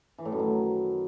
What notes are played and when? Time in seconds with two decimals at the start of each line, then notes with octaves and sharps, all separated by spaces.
0.18 E3
0.25 A2
0.32 F#2
0.39 D#3